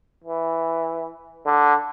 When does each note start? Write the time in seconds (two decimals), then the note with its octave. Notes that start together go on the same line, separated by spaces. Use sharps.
0.24 E3
1.46 D3